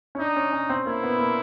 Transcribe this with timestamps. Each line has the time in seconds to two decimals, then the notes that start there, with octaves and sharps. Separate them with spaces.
0.15 C#4
0.19 D4 D#4
0.36 C#4
0.53 C#4
0.70 C4
0.86 A#3 E4
1.03 B3
1.19 A#3